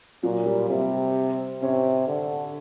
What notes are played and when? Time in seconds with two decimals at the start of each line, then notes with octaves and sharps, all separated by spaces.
0.23 A#2 F#3
0.46 G3
0.69 C3 G3
1.62 C3 C#4
2.08 D3